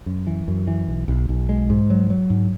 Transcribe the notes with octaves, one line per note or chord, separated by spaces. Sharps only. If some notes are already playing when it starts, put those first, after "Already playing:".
F#2
E3
F#2
E3
B1
B1
B1
G#3
G#2
F#3
F#3
G#2